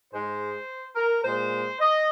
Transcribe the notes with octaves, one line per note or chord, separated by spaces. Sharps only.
G#2 G#3 C5
A#4
A#2 G#3 C5
D#5